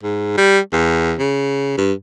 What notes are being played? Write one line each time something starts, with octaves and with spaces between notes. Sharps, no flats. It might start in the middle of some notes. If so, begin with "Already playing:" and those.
G#2
G3
E2
C#3
G2